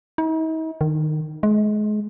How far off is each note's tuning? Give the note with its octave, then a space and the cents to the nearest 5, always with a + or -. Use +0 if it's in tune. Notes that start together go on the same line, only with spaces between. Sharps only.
D#4 +45
D#3 -20
G#3 +30